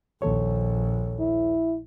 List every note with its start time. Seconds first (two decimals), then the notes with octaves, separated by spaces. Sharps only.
0.22 A#1 D#2 A4 C#5
1.20 E4